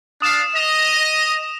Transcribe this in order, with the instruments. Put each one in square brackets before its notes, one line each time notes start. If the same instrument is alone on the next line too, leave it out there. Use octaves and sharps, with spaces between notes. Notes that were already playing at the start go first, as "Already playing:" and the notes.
[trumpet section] D4 F5 [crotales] D#6 E7
[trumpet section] D#5 [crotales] F7